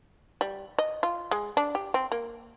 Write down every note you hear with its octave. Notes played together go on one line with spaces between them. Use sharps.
G3
D#5
F4
G#3
D4
G4
C4
A#3